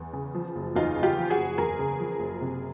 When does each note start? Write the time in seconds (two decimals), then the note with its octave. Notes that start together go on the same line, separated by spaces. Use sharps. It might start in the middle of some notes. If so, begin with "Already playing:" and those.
Already playing: E2
0.13 C#3
0.35 F3
0.56 F#1
0.76 E2 D#4 F4
0.96 C#3
1.03 F4 G4
1.17 F3
1.30 F#4 G#4
1.37 F#1
1.58 E2 G#4 A#4
1.79 C#3
2.00 F3
2.20 F#1
2.41 C3